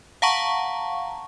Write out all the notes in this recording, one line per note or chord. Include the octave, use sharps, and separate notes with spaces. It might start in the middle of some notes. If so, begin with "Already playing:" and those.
F5 F#5 A5 A#5 C#6